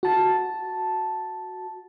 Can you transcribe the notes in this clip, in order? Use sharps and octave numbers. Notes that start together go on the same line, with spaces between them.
F#4 A5